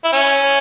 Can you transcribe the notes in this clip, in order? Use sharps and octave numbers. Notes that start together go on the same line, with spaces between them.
E4
C#4